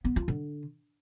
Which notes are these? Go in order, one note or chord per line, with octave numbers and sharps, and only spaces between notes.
B3
F4
D3